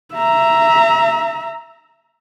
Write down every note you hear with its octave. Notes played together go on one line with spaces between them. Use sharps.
E5 A#5